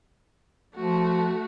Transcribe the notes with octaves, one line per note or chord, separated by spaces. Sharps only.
F3 A3 F#4